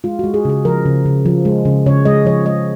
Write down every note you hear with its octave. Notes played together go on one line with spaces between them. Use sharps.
G#3 F4
G#3 F#4
G#4
C#3 G#4
F3 A#4
C#3
C#3
F3
G#3
C#3
C#3 C#5
G#3 D#5
F3 C#5
G#3 D#5